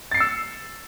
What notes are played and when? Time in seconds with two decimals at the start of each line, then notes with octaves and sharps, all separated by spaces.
0.11 A6
0.14 C7
0.17 C#7
0.20 E6